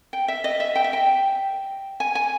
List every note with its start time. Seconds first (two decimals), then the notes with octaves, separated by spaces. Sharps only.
0.13 G5
0.28 E5
0.44 D#5
0.60 E5
0.75 G5
0.84 E5
0.93 G5
2.00 G#5
2.15 G#5